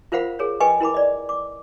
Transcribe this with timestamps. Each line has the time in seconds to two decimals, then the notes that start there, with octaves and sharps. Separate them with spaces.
0.12 F4 A#4 C5 F5 F#5 B5
0.39 G#4 A#4 C#5
0.60 B4 D#5 G5 G#5 C#6
0.80 E4 A#4 B5 D6
0.94 D5 D#5
1.29 D6